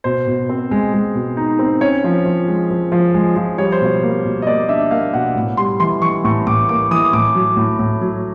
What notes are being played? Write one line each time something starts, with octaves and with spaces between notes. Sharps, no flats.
B2 C5
B2
C4
G#3
G#3
B2
D#4
C4
C#4 C#5
F3
F3
G#3
F3
F3
G#3
F3
G3 C#5
C5
B2 C#5
A#3
B2
D#5
A#3 D5
D4 E5
A#3 F5
B2 F#5
A2
G3 C6
E3 C6
E3 C#6
A2 C#6
A2 D6
A#3 D6
E3 D#6
A2 D6
F#3
A2
A2
F#3